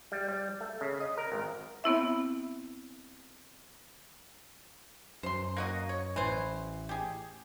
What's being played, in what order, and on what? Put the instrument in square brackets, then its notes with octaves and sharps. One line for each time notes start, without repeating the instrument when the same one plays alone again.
[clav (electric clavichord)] G3
G3
A3
C#3
D#5
A#4
G#1
[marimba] B3 C4 E4 E5
[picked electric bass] F#2 [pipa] C5 C6
[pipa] A#3 F#4 D#5
C#5
[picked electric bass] A1 [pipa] E3 C5
[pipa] G4 G#4